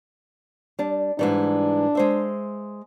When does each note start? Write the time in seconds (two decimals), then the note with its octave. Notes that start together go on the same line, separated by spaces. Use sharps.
0.79 G3 D4
1.19 G#2 E3 G3 D4
1.95 G#3 C5 E5